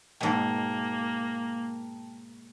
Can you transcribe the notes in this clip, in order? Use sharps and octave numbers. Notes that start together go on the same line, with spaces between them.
G#2 B2 A#3 G5 A5